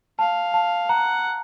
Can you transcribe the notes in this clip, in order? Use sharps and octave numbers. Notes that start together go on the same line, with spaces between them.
F5 A5
A5
F#5 A#5